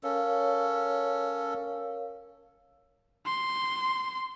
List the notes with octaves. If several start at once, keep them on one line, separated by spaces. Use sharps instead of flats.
C#4 A4 A#4 C#5 F5
C6